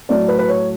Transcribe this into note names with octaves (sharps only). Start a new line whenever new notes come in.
A2 F#3 A3 D5
B4
B4
C#5